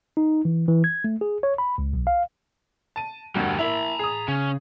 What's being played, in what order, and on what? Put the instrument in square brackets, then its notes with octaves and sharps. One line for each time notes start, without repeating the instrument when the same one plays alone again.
[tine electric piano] D#4
E3
E3
G#6
A3
G#4
C#5
B5
C#2
B1
F5
[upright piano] A5 D#7
[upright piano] E1 G2 F#4 [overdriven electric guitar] D2 G3
[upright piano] A#3 E4 [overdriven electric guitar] A#5 B5
[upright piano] G#4 D#6
[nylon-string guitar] C#3 [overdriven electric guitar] C#4